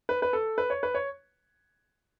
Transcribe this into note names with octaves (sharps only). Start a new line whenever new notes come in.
B4
B4
A4
B4
C#5
B4
C#5